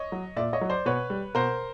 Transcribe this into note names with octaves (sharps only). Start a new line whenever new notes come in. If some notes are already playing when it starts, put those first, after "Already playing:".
Already playing: C#5 D#5
F#3
A#2 D5 E5
C#5 D#5
F#3
C5 D5
B2 B4 C#5
G3
B2 A#4 C5